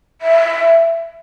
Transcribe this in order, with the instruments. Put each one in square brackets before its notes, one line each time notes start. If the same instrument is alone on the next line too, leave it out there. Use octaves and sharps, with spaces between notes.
[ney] E5